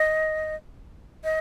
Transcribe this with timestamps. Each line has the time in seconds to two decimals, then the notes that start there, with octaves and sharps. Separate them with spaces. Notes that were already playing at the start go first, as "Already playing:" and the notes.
Already playing: D#5
1.24 D#5